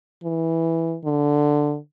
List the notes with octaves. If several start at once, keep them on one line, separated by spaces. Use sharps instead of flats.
E3
D3